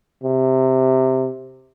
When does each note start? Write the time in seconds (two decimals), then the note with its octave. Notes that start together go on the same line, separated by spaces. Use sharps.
0.24 C3